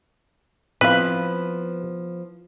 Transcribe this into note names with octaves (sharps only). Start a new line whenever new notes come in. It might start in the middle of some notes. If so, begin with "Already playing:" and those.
F3 B3 C4 E4 B4 F5